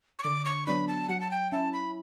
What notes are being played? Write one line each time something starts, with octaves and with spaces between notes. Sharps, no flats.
C#6
D3 D6
C#6
F#3 B3 D4 B5
A5
F#3 F#5
A5
G5
C#4 E4 A5
B5